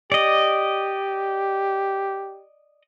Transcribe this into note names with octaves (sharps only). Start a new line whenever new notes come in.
G4 D5 D#5